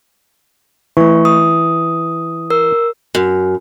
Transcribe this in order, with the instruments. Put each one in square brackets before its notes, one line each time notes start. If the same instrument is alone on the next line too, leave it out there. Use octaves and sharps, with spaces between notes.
[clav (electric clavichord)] E3 [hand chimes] A3 C#6
[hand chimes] D#6
A#4 E6
[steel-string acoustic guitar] F#2